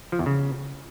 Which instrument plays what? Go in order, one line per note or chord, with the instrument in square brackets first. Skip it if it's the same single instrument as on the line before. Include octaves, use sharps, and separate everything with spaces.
[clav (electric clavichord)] F3
E2
C#3